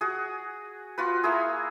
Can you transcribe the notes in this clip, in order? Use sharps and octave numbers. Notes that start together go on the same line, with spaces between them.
F#4 G#4
F4 F#4 B4
A#3 E4 G#4